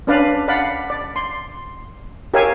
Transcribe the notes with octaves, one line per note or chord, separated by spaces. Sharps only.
C#4 D4 B4 D5 F5
D5 F5 F#5 B5
D5
C6
G4 A#4 C#5 E5 F5 G#5